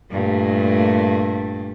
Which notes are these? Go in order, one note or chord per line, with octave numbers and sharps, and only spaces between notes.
G2 A#2 A3